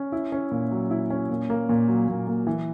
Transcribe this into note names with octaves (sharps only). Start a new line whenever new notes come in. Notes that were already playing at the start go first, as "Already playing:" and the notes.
Already playing: C#4
E4
C#4
A#2
F#3
E4
C#4
A#2
A#3
A#2
F#3
A#2
A#3
E3